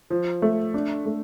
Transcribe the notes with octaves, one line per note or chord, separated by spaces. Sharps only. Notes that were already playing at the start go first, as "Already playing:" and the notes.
F3
A3
D4
A3